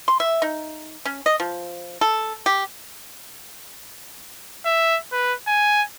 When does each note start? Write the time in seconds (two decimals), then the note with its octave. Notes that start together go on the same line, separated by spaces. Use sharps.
0.08 C6
0.20 E5
0.42 D#4
1.05 C#4
1.26 D#5
1.40 F3
2.01 A4
2.46 G4
4.65 E5
5.12 B4
5.47 G#5